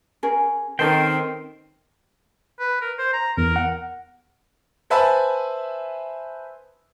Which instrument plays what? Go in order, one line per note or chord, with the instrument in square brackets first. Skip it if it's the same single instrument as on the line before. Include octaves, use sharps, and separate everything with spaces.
[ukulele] C#4 G#4 A#4
[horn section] D#3 [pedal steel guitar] C4 C5 G5 [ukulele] C#4 A4 B4
[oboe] B4
A#4
C5
A#5
[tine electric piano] E2 [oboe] A#4
[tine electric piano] F#5
[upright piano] B4 C5 E5 G#5 A5 B5